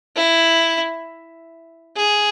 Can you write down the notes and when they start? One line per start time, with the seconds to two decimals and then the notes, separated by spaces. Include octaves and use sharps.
0.16 E4
1.97 G#4